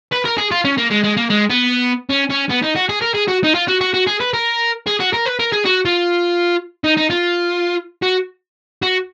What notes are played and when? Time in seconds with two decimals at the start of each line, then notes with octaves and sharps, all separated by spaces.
0.12 B4
0.25 A#4
0.38 G#4
0.51 F4
0.65 C#4
0.78 A#3
0.91 G#3
1.04 G#3
1.17 A#3
1.30 G#3
1.50 B3
2.09 C#4
2.30 C#4
2.49 B3
2.62 D#4
2.75 F#4
2.89 G#4
3.02 A#4
3.15 G#4
3.28 F#4
3.44 D#4
3.55 F4
3.68 F#4
3.81 F#4
3.94 F#4
4.07 G#4
4.21 B4
4.34 A#4
4.86 G#4
5.00 F#4
5.13 A#4
5.25 B4
5.39 A#4
5.52 G#4
5.66 F#4
5.85 F4
6.84 D#4
6.97 D#4
7.11 F4
8.03 F#4
8.82 F#4